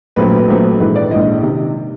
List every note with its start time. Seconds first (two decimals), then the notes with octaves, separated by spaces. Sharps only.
0.16 A#1 A#2 F#3 A3 C4 B4
0.48 A#1 A#2 F#3 A3 C4
0.80 A#1 G#2 E3 G#3 B4
0.96 D5
1.11 A#1 G#2 E3 G#3 D#5
1.42 C3 D#3